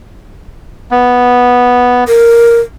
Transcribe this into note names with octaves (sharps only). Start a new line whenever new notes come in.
B3
A#4